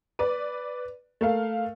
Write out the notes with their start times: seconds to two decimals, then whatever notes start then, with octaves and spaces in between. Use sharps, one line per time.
0.19 B4 D5
1.21 A3 A#4 F5